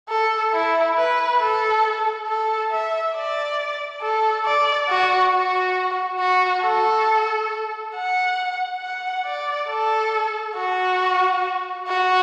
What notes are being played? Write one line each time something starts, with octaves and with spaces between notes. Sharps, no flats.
A4
E4
B4
A4
A4
E5
D5
A4
D5
F#4
F#4
F#4
A4
F#5
F#5
D5
A4
F#4
F#4